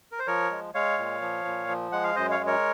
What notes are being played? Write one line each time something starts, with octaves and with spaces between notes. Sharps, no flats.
A#4
C5
F3 A#4 C#5
G#3
G#3 C#5 F5
A#2
F3
A#2
F3
G#3 F#5
F5
F#2 C5 D#5
C#5 F5
G#3
A#4 C#5